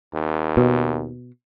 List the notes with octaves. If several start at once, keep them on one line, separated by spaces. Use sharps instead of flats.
D#2
B2